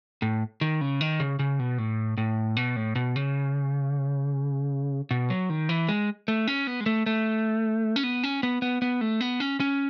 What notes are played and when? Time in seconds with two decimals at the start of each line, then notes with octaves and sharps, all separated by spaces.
0.22 A2
0.61 D#3
0.81 C#3
1.01 D#3
1.20 C#3
1.39 C#3
1.60 B2
1.78 A2
2.18 A2
2.57 B2
2.76 A2
2.96 B2
3.16 C#3
5.11 B2
5.30 F#3
5.50 D#3
5.69 E3
5.89 G#3
6.28 A3
6.47 C#4
6.67 B3
6.80 G#3
6.86 A3
7.06 A3
7.96 C#4
8.04 B3
8.24 C#4
8.43 B3
8.62 B3
8.82 B3
9.01 A3
9.21 B3
9.40 C#4
9.60 C#4